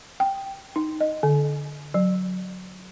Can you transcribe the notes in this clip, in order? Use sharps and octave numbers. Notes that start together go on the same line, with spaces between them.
G5
D#4
D#5
D3
F#3